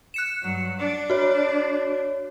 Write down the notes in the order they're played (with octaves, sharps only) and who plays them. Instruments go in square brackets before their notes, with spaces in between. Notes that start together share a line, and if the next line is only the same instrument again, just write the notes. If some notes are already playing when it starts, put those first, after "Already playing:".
[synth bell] F#6 C#7 E7
[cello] G2 F#3
D4
[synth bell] F#4 C#5